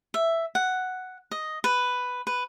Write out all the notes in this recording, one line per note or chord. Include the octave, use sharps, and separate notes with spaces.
E5
F#5
D#5
B4
B4